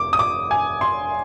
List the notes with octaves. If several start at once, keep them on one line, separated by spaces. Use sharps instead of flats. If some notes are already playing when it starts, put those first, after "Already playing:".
Already playing: F1 D6
D#6
D6
G#5
C6